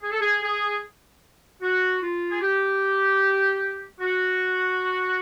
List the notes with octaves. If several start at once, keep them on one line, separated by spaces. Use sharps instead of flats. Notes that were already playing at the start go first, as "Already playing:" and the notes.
G#4
A4
G#4
G#4
F#4
F4
G#4
G4
F#4